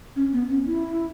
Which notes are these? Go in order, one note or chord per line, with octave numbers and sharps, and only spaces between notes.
C#4
B3
C#4
E4